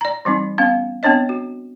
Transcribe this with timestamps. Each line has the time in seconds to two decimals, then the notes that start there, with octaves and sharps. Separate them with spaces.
0.01 D5 A#5
0.25 E3 G3 C4 D#4
0.58 B3 C#4 F5
1.03 B3 C4 D4 C#5 D#5
1.29 F#4